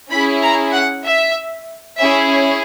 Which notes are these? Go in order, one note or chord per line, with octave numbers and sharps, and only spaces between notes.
C#4 E4 G#4 B5
A#5
F#5
E5
C#4 E4 G#4 E5